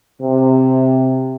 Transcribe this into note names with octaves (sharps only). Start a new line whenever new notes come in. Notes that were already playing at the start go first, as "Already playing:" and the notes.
C3